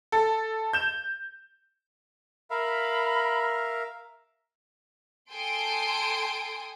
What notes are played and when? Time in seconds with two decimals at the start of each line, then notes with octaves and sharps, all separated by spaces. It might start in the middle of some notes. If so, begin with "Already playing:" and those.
0.12 A4
0.73 G6 E7
2.50 A#4 E5 F5 B5
5.31 A4 G5 G#5 C6 D#6 D7